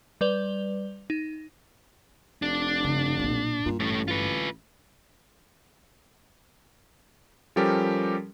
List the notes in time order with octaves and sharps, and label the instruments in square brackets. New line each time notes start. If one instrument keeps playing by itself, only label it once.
[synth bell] G3 B4 D5 F7 G7
D#4
[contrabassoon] F1 [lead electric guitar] D4
[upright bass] G2 C#3
B1 A#2
[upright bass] G2 [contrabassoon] A#2
[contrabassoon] A1 [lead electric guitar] A3 C#5
[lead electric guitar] F4 B4
[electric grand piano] F3 G3 C#4 G4 A4 A#4